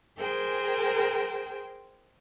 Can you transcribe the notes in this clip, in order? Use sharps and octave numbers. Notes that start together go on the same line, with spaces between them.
G#4 A#4 C5 G5 G#5